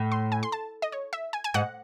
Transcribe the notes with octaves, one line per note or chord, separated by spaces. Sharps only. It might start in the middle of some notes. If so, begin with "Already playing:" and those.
Already playing: A2
C6
G#5
C6
A5
D#5
C#5
E5
G#5
G#5
G#2 F#5